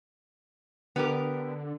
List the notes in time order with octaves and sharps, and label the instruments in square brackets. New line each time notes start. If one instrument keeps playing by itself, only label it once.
[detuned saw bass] D3 [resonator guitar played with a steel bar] B3 G4 A#4